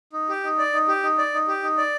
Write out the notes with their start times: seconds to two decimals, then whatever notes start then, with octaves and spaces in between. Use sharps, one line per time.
0.13 D#4
0.29 G4
0.44 D#4
0.58 D5
0.73 D#4
0.88 G4
1.03 D#4
1.18 D5
1.34 D#4
1.48 G4
1.63 D#4
1.78 D5